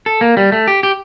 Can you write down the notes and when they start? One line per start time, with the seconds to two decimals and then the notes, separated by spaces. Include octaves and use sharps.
0.06 A4
0.21 A#3
0.37 G3
0.52 A3
0.67 G4
0.83 G4